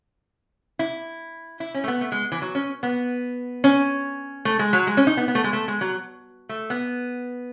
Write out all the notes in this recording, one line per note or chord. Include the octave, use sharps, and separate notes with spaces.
E4
E4
C#4
A3
B3
A3
G#3
E3
F#3
C#4
B3
C#4
A3
G#3
F#3
G#3
C#4
D#4
B3
B3
A3
G#3
A3
G#3
F#3
A3
B3